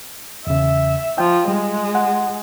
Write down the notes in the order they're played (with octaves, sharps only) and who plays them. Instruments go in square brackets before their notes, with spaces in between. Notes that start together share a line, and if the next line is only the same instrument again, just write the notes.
[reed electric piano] E2 C#3 [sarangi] E5
[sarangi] F3 [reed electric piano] G5
[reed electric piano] G3 [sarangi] G#3
[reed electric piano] F#5